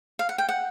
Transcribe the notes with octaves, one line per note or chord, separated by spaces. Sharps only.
F5
F#5
G5
F#5